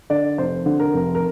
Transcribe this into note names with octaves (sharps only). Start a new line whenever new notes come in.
D3 D5
F1 C5
D3
A#4
F1
A#4